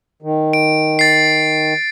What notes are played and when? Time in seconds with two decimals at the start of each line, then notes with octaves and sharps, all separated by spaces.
0.22 D#3
0.53 D7
0.99 A6 C7